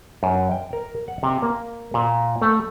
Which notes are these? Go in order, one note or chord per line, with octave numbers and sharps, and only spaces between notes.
F#2
G5
A#4
F#5
C3
A#3
A#2
A3